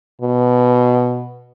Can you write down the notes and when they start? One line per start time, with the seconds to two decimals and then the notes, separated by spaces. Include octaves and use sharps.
0.21 B2